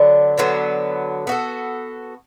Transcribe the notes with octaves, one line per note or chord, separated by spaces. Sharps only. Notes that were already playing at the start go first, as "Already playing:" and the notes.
Already playing: D3 F#3 B3 D4
D3 F#3 B3 D4
B3 F#4 A4